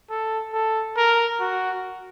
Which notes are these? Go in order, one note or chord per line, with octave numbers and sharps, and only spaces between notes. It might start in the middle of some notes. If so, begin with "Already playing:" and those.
A4
A4
A#4
F#4